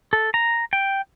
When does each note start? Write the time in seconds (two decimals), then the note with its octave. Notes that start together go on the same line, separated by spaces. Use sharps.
0.13 A4
0.34 A#5
0.73 G5